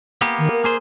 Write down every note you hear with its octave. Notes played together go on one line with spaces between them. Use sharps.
A#3 B3 G4
D#3
A#4
A#3 G#4 C5